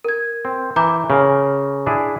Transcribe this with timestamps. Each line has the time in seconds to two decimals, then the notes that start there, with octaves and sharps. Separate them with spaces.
0.04 A#4 G#6
0.45 C4
0.76 E3 A#5 D6 G6
1.10 C#3 A#4 F5
1.86 D4 E4 G#4